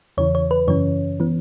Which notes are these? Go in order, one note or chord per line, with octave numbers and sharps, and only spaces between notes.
E2 C#3 E3 C#5
C#5
B4
F#2 C#3 E3 C#4 C#5
E3 B3